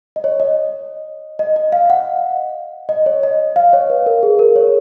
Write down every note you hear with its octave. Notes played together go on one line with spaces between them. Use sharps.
D#5
C#5
D#5
D#5
D#5
F5
F#5
D#5
C#5
D#5
F5
C#5
B4
A#4
G#4
A#4
C#5